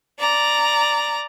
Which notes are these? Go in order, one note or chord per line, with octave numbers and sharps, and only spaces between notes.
D5 A#5